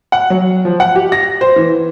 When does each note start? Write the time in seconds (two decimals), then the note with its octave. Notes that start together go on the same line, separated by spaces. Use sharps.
0.12 F#5
0.30 F#3
0.65 F3
0.80 F#5
0.96 G4
1.12 A#6
1.41 C5
1.56 E3